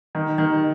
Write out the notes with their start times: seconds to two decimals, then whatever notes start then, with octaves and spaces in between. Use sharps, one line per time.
0.15 D#3
0.38 D#3